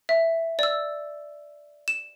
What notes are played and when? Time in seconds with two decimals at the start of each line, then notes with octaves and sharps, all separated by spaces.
0.09 E5
0.59 D5 E6
1.88 E7